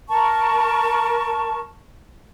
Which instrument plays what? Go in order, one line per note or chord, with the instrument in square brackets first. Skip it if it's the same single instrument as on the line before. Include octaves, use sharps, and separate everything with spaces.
[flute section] A#4 A5 C#6